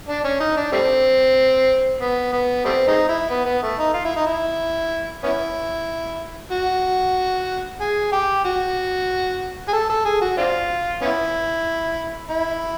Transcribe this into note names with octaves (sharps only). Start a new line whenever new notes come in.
D4
C#4
D#4
D4
G3 A3 C4
B3
B3
G3 A3 C4
G#3 C4 D#4
E4
B3
B3
A3
D#4
F4
E4
D#4
E4
B3 C#4 E4
F#4
G#4
G4
F#4
G#4
A4
A4
G#4
F#4
C4 D4 F4
B3 C#4 E4
E4